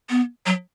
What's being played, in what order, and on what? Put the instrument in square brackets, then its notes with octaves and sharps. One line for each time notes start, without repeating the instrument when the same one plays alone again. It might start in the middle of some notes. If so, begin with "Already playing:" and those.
[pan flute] B3
F#3